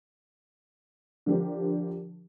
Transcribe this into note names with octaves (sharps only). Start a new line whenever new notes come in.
D3 F3 D4 G4 A#4 C5